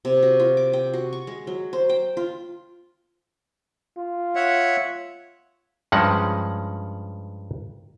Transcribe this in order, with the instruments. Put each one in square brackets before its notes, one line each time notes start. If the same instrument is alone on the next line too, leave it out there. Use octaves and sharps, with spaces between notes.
[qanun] C3
F#4
F4
D6
G5
F#4
C#6
G#3
F#3
C5
G5
F4
[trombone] F4
[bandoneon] C#5 E5 F#5
[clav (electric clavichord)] G2 F3 G#3 C#4 F#5